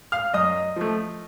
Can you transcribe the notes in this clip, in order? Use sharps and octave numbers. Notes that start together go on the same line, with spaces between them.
F5 F6
F#2 D#5 D#6
F3 A3